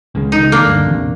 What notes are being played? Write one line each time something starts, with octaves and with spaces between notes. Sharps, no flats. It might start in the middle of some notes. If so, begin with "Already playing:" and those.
C#2 C#3 G#3
D#4
A#3 D4
D2 G2
A#1 E2 C3